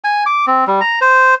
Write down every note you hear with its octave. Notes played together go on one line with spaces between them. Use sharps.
G#5
D6
C4
G3
A#5
C5